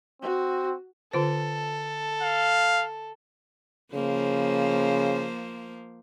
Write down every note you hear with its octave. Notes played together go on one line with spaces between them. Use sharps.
C4 F#4
D3 F4 A4 C5
F5
C#3 F3 A#3 C5